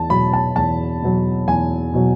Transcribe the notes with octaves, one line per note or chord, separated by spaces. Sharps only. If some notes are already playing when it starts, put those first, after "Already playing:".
Already playing: E2 A5
B2 F#3 B5
A5
E2 A5
B2 F#3
E2 G#5
B2 F#3